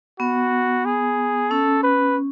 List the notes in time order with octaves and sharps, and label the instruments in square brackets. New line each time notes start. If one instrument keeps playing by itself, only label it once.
[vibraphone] B3 [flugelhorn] F#4
[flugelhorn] G#4
[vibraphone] C#4 [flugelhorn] A4
[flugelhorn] B4